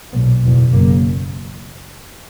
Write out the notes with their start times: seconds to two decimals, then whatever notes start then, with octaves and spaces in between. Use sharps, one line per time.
0.13 B1 A#2 B3
0.44 F#1 E2 B2
0.72 F#1 F#2 C#3 A#3